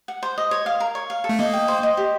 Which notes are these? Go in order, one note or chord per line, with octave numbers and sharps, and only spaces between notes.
F#5
C5
D#5
C#5
F5
A#4
C#5
F5
A4
A3
A#3 D#5
G5
C5
D#5
G4